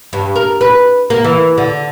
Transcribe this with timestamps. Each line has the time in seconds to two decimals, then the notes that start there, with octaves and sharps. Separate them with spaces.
0.13 G2
0.36 A#4
0.61 B4
1.10 A#3
1.24 E3
1.58 D3